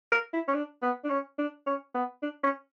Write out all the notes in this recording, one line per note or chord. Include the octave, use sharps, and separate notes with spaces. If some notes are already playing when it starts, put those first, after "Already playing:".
A#4
E4
C#4
D4
B3
D4
C#4
D4
C#4
B3
D4
C#4